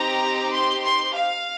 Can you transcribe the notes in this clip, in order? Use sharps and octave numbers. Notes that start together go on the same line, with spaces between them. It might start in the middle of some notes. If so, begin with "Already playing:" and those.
Already playing: C4 D#4 G4 A#5
C6
C6
F5